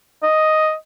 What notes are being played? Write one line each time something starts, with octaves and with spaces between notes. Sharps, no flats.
D#5